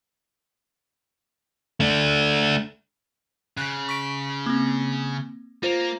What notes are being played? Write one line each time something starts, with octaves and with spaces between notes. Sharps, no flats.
A3 D4
C#3 F#6
C#6 B6 D7
A#3 C4
A#3 F4 C5 F7